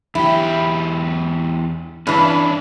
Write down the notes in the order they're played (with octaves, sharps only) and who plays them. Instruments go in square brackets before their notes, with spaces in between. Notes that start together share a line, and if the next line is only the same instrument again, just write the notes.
[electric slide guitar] E2 E3 G4 [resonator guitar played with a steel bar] E4
[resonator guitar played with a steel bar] G2 E3 [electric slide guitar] C#4 D4